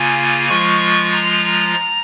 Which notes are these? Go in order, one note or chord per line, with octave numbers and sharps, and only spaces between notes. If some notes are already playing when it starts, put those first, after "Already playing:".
Already playing: C#3 A#3 F4 G#5
F3 G#3 F4 C#6
A#5